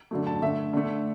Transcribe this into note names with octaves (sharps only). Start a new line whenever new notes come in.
D3 F#3 A3
A5
D3 A3 E5
D3 A3